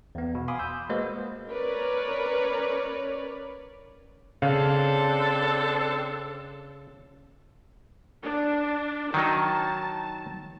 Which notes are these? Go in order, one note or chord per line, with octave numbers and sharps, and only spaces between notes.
E2 B3
B2
F5 G#5 B5 C6 D6 D#6
E6 G6
G#3 A#3 F#4 B4 C5 D#5
C#4 A#4 B4 C#5 D5
C#3 C4 D4 A4 F5
D4
D#3 F#3 D#4 A5